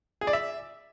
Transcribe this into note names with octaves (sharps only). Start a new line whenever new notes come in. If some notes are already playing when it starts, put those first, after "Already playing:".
G#4
D5
E5